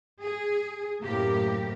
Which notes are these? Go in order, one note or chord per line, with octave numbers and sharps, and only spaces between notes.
G#4
F#2 A2 C3 A#3 G4 A#4